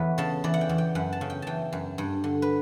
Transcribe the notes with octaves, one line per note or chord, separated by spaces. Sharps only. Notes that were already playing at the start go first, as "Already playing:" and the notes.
Already playing: E2 B4 C#5
C#3 A5
E3 D5
F#5
G5
E2
G5
F#2 F#5
A5
C#3
G5
E3 G5 A5
F#2
G2
D3
B4